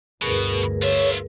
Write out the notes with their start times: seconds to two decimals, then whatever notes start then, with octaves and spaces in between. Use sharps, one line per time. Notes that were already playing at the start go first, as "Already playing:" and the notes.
0.22 G1 D2 B2 G#4 A#4 B4
0.83 F4 C#5 E5